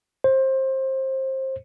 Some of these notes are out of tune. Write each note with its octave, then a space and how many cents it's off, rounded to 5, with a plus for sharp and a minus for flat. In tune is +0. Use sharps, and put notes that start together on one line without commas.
C5 +25